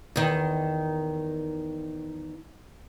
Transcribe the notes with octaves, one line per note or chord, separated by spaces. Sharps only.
E2 D#3